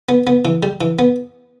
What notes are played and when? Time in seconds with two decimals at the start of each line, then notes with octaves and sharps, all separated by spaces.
0.09 B3
0.27 B3
0.45 E3
0.63 G3
0.81 E3
0.99 B3